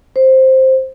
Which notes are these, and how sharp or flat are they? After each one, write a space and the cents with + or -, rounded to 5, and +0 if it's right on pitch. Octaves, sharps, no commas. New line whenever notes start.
C5 +5